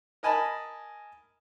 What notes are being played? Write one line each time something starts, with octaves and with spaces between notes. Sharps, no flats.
A#4 D#5 G#5 A5 B5